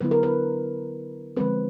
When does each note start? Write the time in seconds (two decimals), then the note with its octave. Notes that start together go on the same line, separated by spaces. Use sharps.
0.01 D3 F#3 B3 E4 B4
0.11 A#4
0.23 B4
1.37 D3 F3 G#3 C4 B4